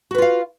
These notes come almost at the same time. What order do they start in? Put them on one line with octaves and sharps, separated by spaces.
F#4 B4 F4 F5